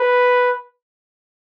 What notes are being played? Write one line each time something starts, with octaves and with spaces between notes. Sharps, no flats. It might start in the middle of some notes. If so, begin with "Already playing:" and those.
Already playing: B4